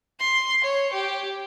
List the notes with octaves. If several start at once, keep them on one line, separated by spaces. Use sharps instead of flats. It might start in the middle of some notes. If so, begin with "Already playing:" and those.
C6
C#5
G4